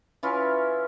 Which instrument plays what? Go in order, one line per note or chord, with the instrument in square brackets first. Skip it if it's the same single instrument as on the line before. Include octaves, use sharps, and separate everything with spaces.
[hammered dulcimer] E3 C#4 E4 F4